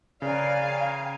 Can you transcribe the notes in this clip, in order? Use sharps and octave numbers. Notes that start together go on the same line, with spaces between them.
C#3 A#4 B4 D5 F5 G#5
G5 A#5